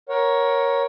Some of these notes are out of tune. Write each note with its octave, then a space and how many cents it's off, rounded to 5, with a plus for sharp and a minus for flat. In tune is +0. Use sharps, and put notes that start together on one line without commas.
A#4 +15 C#5 +0 F#5 +0